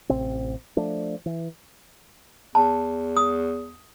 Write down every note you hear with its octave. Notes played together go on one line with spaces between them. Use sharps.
A1 C3 C4
F3 A3 D4
E3
E2 A5
D#6